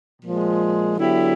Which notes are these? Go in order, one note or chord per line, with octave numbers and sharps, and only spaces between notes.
A#2 F3 G#3
D3 F#3 B3 E4 G4